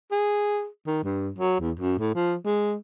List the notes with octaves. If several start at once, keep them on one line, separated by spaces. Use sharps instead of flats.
G#4
D#3
G2
F#3
E2
F#2
A2
F3
G#3